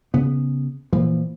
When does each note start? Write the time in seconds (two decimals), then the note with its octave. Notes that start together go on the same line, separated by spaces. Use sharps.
0.14 C#3 B3
0.93 A#2 E3 F3